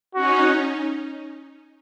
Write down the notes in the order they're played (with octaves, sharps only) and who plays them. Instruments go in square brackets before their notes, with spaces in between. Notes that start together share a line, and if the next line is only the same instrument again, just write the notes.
[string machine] C#4 D#4 [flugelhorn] F#4